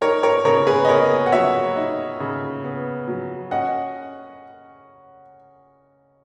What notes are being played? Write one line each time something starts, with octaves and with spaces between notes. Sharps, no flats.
D#4 A#4 C#5
A#4 C#5
C#3 A#4 C#5
G#4 B4
D#5
B3 A#4 C#5
F#5
F#3 C#5 E5
D#4
C#3
B3
F#3
C#4 D#5 F#5